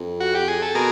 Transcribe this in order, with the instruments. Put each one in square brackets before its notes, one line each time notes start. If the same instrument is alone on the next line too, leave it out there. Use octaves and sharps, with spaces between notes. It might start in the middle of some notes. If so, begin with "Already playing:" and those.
Already playing: [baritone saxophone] F2
[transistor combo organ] F#4
G4
G#4
A4
[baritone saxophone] B2 [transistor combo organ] G#4 A#4